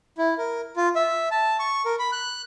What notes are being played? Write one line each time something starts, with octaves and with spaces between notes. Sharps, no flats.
E4
A#4
F4
E5
A5
C#6
A#4
B5
F#6